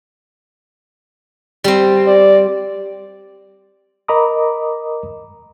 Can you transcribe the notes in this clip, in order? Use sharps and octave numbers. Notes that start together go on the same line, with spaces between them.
G3 C4
D5
A#4 D#5 A#5 B5 D6 D#6